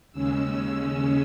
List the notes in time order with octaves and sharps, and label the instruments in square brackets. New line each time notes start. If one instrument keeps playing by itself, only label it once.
[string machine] D#2 C#3 G#3 C#4 E6
E6